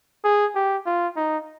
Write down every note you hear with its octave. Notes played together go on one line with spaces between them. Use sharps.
G#4
G4
F4
D#4